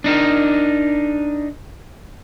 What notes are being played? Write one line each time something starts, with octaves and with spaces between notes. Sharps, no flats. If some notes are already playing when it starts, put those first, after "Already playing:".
D4 D#4 A#4